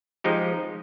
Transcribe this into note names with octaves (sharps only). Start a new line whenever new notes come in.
F3 G#3 D#4 G4